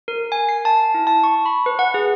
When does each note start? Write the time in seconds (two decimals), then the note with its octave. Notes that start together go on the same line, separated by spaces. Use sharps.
0.08 A#4
0.32 G#5
0.49 C7
0.65 A5
0.94 E4
1.07 A5
1.24 C#6
1.46 B5
1.66 B4
1.79 F#5
1.94 G#4